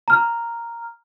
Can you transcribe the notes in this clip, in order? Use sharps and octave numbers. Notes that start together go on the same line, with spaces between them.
A#5 F6